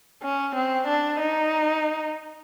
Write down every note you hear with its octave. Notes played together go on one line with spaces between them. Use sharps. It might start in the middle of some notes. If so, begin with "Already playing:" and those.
C#4
C4
D4
D#4